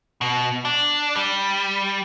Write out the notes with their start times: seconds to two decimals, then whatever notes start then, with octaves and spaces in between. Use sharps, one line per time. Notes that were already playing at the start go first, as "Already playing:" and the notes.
0.21 B2
0.65 D4
1.16 G3